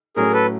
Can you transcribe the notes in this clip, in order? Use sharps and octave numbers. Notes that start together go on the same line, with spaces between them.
A2 F#3 A3 C#4 G#4 A#4
A4 B4